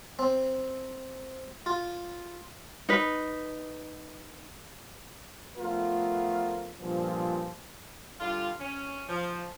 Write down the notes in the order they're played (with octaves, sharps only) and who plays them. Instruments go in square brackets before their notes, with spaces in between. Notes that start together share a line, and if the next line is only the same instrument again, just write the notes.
[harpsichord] C4
F4
[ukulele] D#4 B4
[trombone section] F3 A3 B3 F4 A#4
G2 A#2 F3
[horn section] D3 G3 F4
C#4
F3